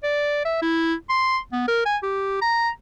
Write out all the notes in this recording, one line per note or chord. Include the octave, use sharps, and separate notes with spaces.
D5
E5
E4
C6
B3
A#4
G#5
G4
A#5